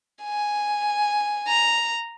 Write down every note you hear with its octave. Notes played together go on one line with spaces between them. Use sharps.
G#5
A#5